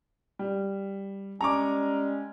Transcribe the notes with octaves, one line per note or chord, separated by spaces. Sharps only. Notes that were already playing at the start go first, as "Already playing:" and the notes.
G3
G3 G#3 C#4 A#5 C#6 D6